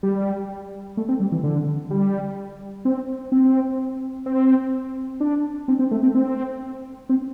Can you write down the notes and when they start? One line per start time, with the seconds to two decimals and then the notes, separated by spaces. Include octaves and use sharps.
0.03 G3
0.97 A3
1.09 C4
1.20 G3
1.32 E3
1.43 D3
1.91 G3
2.85 C4
3.32 C4
4.26 C4
5.20 D4
5.68 C4
5.79 C4
5.91 A3
6.03 C4
6.15 C4
7.09 C4